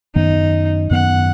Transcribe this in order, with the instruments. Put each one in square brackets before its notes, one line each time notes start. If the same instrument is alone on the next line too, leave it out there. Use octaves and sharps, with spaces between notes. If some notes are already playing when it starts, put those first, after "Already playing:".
[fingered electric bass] F#2 D#3 B3 [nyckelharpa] D#4
[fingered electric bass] F#2 D#3 B3 [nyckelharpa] F#5